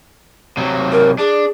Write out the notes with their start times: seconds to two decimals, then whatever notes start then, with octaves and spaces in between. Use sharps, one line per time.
0.57 C3 F#3
0.92 A#4
1.18 D4 G#4